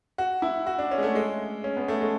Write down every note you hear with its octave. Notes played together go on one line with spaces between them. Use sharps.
F#4
E4
F#4
D4
C#4
G#3
A3
G#3
C#4
B3
A3
G#3